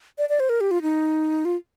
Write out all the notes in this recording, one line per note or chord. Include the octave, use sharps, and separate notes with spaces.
D5
D5
C5
A#4
G4
F4
D#4
F4